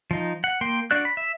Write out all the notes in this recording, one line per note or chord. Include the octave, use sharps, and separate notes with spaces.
F3 D#4
F#5
A#3 G5 C6
D4 F#4 D5 F#6
B5
E5